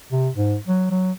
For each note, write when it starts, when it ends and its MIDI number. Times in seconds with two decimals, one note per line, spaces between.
0.12 0.29 48
0.35 0.57 44
0.68 0.86 54
0.91 1.12 54